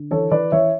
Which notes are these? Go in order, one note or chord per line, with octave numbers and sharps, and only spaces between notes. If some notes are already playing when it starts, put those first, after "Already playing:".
Already playing: D3
E3 A4 C#5
E3 B4 D5
E3 C#5 E5